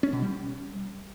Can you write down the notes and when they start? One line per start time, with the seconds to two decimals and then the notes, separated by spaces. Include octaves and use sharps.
0.03 C#4
0.13 B2
0.22 G3